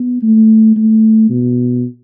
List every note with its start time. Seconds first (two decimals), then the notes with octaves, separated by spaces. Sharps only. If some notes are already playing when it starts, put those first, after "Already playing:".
Already playing: B3
0.23 A3
0.77 A3
1.30 B2